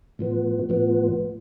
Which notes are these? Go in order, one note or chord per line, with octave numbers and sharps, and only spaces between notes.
A2 F3 B3
A2 F3 B3